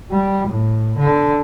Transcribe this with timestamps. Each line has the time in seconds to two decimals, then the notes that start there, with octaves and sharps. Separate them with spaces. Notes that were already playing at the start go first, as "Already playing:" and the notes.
0.11 G3
0.48 A2
0.98 D3